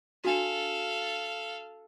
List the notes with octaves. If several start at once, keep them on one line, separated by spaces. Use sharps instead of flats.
D4 F#4 A4 F5